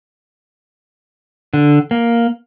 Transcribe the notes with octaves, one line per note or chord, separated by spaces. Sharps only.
D3
A#3